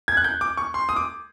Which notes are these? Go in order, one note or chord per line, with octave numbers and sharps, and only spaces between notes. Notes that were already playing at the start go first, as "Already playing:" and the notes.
G#6
F#6
G6
D6
C#6
C6
D#6
D6